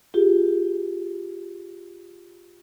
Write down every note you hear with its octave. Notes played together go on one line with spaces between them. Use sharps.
F4 G4 G#4